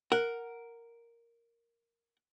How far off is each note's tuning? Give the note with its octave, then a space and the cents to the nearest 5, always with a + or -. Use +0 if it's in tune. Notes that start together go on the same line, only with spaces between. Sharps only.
A#4 +0 F#5 +0